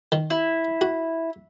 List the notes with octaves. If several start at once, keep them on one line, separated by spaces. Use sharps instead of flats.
D#3
E4
F#4